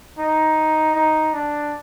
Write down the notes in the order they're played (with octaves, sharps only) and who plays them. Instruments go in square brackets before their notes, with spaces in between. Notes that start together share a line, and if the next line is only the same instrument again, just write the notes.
[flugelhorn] D#4
D#4
D4